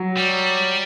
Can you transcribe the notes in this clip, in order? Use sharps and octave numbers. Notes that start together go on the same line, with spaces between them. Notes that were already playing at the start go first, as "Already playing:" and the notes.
Already playing: F#3
G3